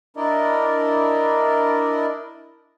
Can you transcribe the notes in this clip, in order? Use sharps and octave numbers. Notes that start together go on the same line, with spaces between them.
D4 E4 A#4 D5 D#5